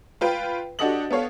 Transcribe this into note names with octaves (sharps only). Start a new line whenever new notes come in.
F4 B4 G5
D4 F#4 G4 A4 D#5 F#7
B3 A4 C#5 F5